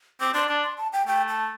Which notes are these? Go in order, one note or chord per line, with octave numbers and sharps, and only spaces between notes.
C4 D6
D4 C6
D4 A5
C6
A5
G5
A3 G5
A5